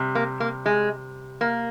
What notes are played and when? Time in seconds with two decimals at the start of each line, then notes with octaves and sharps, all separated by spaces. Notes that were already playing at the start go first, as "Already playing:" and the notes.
Already playing: C3 G3
0.15 A#3
0.40 A#3
0.66 G#3
1.41 A#3